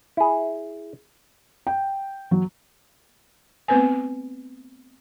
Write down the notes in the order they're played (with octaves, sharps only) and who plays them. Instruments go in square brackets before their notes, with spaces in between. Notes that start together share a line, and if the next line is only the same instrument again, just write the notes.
[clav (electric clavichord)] E4 G#4
[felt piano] G5
F#3
[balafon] A3 B3 C4 B4 C5 G#5